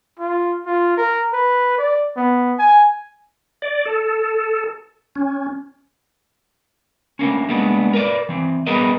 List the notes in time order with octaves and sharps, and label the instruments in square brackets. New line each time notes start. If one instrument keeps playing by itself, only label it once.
[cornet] F4
F4
A#4
B4
D5
B3
G#5
[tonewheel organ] D5
A4
C#4
[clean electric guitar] D3 A3 A#3 C#4
G3 G#3 A#3 B3 D4
A#4 B4 D5
E3 C4
G3 B3 G#4 A#4 B4 D#5